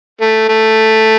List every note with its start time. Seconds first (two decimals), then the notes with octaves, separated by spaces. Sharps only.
0.21 A3
0.49 A3